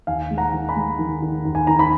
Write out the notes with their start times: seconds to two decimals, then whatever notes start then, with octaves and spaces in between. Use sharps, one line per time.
0.07 D#2 F5 G#5
0.31 G#3
0.38 F#5 A#5
0.53 D#3
0.69 G#5 B5
0.76 G#3
0.99 D#3
1.22 D#3
1.45 D#2
1.55 G#5
1.67 D#3 A#5
1.79 B5